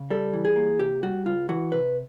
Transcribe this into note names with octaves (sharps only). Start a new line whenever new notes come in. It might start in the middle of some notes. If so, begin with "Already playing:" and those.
Already playing: C#3
G3 A4
E3
G#4
A#3
C3 G4
G3 F#4
C#2 F4
E3 F#4
C3 B4